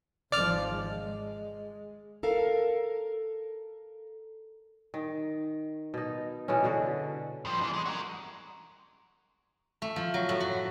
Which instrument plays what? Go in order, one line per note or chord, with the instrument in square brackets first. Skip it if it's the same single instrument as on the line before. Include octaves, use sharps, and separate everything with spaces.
[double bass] G#1 F3 [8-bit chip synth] D5 F6
[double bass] G#3
[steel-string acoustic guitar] A4 A#4 F5
[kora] D#3
B2 D#4
B2 E3 G#3 C#4
B2 D3 F#4
[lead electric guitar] G2 F3
E3 D4
G#3
F#4 A#4
[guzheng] A3
F3
F#3
A2
F#4